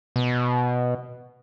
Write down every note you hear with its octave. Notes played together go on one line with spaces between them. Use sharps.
B2